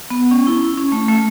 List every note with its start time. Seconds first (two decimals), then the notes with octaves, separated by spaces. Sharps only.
0.10 B3
0.31 C#4
0.47 E4
0.78 C#4
0.92 A3
1.08 A3